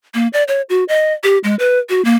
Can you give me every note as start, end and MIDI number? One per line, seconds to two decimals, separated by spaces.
0.14 0.28 58
0.33 0.44 74
0.48 0.62 73
0.69 0.84 66
0.88 1.13 75
1.24 1.38 67
1.44 1.55 56
1.59 1.79 71
1.89 2.03 66
2.05 2.16 58